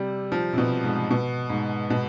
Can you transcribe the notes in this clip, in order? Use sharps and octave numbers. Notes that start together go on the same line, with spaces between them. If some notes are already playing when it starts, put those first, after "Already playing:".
Already playing: C3 G3
F3
C3
B2
G#2
B2
G#2
B2